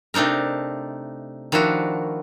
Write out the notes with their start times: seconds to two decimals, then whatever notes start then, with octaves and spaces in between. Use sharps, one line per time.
0.14 C3 A3 D4 D#4 A#4
1.52 D#3 F3 D4 E4 F#4